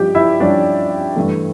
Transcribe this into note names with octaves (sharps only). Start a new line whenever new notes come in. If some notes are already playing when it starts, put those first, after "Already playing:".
Already playing: G2 F3 C#4 G4 G5
E4 E5
G2 F3 C#4 D4 D5
G2 E3 A3